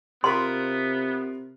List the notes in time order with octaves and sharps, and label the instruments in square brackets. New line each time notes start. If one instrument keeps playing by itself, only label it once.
[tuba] C3 [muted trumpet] B3 [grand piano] F4 A#4 B5 [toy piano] C6